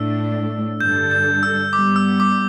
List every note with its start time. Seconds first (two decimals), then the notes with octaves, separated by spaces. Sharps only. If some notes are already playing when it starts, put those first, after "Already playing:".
Already playing: A2 A3 D4 E6
0.80 G2 D3 G3 D4 A4 G6
1.11 G6
1.43 E6
1.73 G2 G3 B3 D6
1.96 E6
2.20 D6